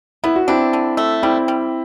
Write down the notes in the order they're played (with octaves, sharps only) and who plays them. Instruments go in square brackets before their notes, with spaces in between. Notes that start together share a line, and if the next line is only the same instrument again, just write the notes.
[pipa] B3 [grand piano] E4
[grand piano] F#4
[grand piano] C4 E4 [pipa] D4
[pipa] D3
A3
[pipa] G3 [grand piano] C4 E4
[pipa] G3